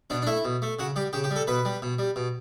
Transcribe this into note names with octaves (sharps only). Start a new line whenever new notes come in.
B2 D4
D4
A3 E4
B2
A3
C#3 F#4
G3 G4
C#3 G4
G4
G3
A4
B2 B4
G3
B2
G3
B2